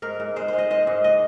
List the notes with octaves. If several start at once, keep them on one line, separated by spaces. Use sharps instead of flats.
G#2 A#4
G#2
G#3 C5
G#3 C5
D#5
G#3 D#5
G#2
D#5